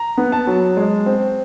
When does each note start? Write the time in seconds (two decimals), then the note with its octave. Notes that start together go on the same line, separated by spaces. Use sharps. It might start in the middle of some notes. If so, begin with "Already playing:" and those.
Already playing: A#5
0.18 B3
0.32 A5
0.47 F#3
0.77 G#3
1.06 C4